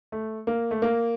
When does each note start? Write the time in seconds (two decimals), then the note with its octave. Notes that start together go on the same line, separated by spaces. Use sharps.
0.12 A3
0.47 A#3
0.71 A3
0.82 A#3